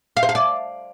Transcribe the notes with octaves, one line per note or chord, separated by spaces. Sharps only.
F5
C5
F5
D5